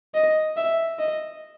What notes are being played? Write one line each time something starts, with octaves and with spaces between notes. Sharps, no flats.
D#5
E5
D#5